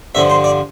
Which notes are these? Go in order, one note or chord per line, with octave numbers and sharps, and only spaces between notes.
G2 D3 F3 E5
C5
D5